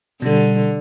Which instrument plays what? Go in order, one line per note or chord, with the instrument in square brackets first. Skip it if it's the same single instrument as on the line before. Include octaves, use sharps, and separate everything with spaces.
[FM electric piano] B2 G3 [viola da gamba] D3